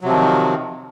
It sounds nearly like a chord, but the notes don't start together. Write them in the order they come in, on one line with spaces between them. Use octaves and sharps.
F#3 C3 F3 D#3